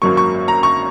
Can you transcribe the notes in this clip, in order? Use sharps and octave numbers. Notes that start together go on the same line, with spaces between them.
G#1 F#2 F#3 A#3 C#6
C#6
A#5
C#6